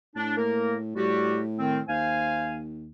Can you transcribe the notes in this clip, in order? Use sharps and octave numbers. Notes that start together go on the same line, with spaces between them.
A2 D4
A#3 A#4
A2 G3 F#4 G4
D#3 C4
D#2 C5 F5 G#5